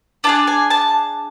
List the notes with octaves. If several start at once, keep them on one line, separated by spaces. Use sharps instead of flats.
D4 F4 G#4 A5
G#5
A5